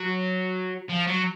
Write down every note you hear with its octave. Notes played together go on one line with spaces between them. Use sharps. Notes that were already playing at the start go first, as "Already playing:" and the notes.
Already playing: F#3
F3
F#3